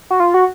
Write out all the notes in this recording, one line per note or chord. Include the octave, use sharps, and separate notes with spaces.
F#4
F4
F#4